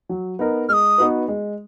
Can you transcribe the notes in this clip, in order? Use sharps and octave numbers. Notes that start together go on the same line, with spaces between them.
F#3
B3 D#4 A#4
G#3 D#6 F6
B3 D#4 F#4 B4
G#3